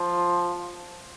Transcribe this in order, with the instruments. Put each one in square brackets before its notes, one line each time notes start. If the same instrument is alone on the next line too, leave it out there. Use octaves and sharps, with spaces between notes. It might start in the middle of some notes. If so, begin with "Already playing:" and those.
Already playing: [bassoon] F3